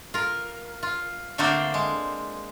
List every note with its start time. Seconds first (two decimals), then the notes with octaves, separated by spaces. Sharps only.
0.14 F4 A#4
0.83 F4
1.38 D3 A3 A#3 C4 D4 C5
1.74 G#3